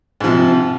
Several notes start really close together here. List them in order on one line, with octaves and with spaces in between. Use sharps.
G#2 F3 C3